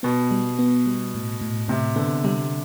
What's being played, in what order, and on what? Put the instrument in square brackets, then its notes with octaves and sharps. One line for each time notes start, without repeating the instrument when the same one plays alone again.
[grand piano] B2 [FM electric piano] B3
[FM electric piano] G3
B3
G3
A2
A2
[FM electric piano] A2 [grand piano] C3
[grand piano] D3 [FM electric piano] B3
[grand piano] C3 [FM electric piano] G3